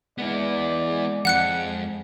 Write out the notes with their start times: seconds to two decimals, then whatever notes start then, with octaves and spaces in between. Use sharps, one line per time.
0.18 G#3 B3 E4 D5
1.25 F2 F#5 F#6 C#7